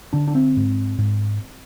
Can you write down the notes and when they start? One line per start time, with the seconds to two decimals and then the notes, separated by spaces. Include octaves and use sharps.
0.13 D3 D4
0.28 D4
0.35 C4
0.57 G#2
0.99 G#2